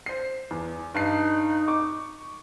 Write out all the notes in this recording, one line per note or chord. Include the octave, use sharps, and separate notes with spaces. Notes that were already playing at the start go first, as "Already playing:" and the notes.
C5 C7
E2
G2 D#4 A5 C7
C#6 D6